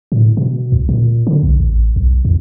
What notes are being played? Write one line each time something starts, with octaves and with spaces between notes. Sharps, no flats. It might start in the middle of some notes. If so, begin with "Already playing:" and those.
A2
B2
C#2
A#2
D3
B1
A1
B1
E2